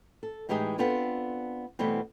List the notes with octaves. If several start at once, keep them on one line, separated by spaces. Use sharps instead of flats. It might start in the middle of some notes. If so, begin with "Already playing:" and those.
A4
A2 E3 G#3 D#4 G4 G#4
B3 C4 D4 F4 A4
B2 E3 G3 A3 B3 C4